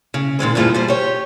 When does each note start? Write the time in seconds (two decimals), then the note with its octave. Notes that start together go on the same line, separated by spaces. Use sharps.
0.14 C#3
0.39 A#2 D#3 G#3 C4
0.55 E2 G2 A#2 F4 G#4 A4
0.74 B2 G3 C5
0.88 G4 C#5